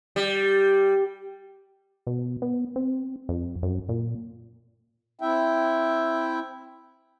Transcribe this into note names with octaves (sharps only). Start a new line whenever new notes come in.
G3
B2
B3
C4
F2
F#2
A#2
C4 E4 E5 G5